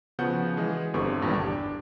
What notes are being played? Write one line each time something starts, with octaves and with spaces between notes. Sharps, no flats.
C#3 F3 B3 F#4 F#5 G6
E3 G#3 G#4
G1 D3 C4 G4 C#6
G#1 E2 G2 A#2 G3
D4 G4